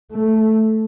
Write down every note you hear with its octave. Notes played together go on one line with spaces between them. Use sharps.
A3